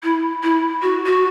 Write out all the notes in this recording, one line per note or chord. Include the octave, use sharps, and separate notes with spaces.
E4
E4
F#4
F#4